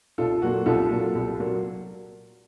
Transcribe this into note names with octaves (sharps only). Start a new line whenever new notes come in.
C2 F4 A4
A#2 F#3 A#3 F#4
C2 F4 A4
A#2 F#3 A#3
C2
A#2 F#3 A#3